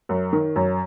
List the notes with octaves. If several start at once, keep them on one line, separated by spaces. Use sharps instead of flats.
F#2
D#3
F#2